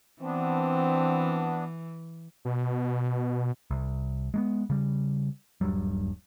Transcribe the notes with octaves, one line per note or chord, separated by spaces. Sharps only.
E3 B3 C4 D4
B2
C2
G#3 A3 B3
C#3 G3
D#1 G2 F#3 G3